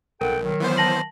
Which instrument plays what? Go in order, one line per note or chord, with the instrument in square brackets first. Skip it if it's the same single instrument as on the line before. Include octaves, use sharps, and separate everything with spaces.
[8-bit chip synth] B1 [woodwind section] A4 F#5 G5 [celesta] A#4
[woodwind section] D#3 F#3
[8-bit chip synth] E3 B3 C5
[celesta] A5 A#6 F#7